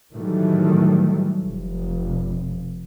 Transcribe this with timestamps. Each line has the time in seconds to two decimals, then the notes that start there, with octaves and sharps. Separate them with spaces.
0.13 A2 D#3 E3 F#3 G3 A3
1.44 F1